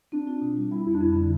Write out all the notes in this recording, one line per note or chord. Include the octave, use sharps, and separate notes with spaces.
C4 D4
F4
B2
G3
G3 E4
F2 E4
D4
F2 E4
D3